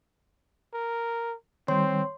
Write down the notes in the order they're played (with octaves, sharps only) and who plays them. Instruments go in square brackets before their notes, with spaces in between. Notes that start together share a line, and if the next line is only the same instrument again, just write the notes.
[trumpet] A#4
[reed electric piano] D#3 G3 [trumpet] C4 [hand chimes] C#5 C6